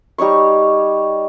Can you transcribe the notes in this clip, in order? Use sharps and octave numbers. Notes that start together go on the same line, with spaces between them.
G3 D#4 C#5 C#6